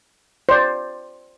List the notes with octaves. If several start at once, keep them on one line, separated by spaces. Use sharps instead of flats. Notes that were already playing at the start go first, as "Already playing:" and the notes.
C5 D5